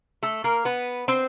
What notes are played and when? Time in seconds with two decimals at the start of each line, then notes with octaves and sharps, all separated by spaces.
0.23 A3 A4
0.44 A#3 A#4
0.65 B3 B4
1.08 C4 C5